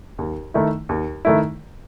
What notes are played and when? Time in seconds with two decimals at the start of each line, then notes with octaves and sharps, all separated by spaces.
0.19 D#2
0.54 D#3 A3 E4
0.89 D#2
1.25 D#3 A3 E4